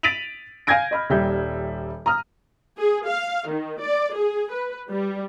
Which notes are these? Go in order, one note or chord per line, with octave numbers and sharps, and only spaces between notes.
A6 B6 D7 D#7 F7 F#7
F5 G#5 G6 G#6 A#6 D7
D#5 B5 F6
D#1 G3 E5 G6
A#5 D#6 F6
G#4
F5
D#3
D5
G#4
B4
G3